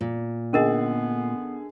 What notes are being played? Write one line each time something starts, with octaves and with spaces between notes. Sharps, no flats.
A#2
D3 B3 C#4 G#4 A#4 D#5